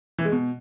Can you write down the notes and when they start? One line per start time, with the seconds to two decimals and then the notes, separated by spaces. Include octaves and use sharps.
0.18 E3
0.25 G#3
0.32 B2